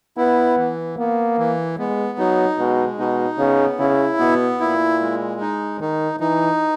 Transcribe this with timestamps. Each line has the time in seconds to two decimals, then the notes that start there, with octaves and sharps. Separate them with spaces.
0.17 B3 E4
0.57 E3
0.98 A#3 B3
1.37 E3
1.78 G#3 B3
2.18 F#3 D#4
2.58 B2 G#3
2.99 B2 D#4
3.39 C#3 B3
3.79 C#3 E4
4.19 B2 B3
4.60 A#2 E4
5.01 G#3
5.41 D#4
5.81 D#3 D#4
6.20 E3 D#4